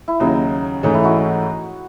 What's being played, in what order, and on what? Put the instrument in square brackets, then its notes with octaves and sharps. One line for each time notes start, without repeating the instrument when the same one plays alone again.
[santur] E4
[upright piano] D#2 C#3 F#3 [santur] D#4
[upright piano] G#2 E3 A3 C#4 [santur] D#4
[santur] E4
D#4 F#4